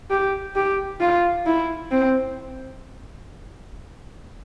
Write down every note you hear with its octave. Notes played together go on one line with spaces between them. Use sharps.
G4
G4
F4
E4
C4